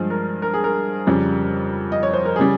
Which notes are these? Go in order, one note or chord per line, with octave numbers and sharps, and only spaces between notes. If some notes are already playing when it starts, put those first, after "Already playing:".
Already playing: G2 F3 G#3
A#4
A#4
G#4
A#4
F2 C#3 G3
D#5
C#5
C5
A#4
C#3 G3 G#4